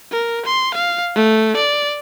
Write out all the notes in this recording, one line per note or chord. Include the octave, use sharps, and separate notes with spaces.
A#4
C6
F5
A3
D5